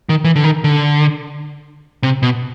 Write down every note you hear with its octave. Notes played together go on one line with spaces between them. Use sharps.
D#3
E3
D3
D#3
D3
C3
B2